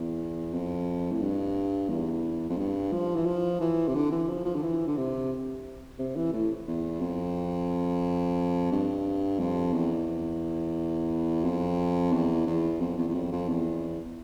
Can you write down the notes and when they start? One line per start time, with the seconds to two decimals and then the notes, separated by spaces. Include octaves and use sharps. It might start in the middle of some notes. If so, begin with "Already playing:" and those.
Already playing: E2
0.53 F2
1.12 A2
1.22 G2
1.89 E2
2.49 F2
2.58 G2
2.92 F3
3.15 E3
3.26 F3
3.60 E3
3.88 C3
3.95 D3
4.11 E3
4.28 F3
4.45 F3
4.55 D3
4.63 E3
4.87 D3
4.97 C3
5.99 C3
6.16 E3
6.33 A2
6.67 E2
7.01 F2
8.72 G2
9.39 F2
9.73 E2
11.44 F2
12.12 E2
12.47 E2
12.81 F2
12.98 E2
13.08 E2
13.15 F2
13.32 F2
13.49 E2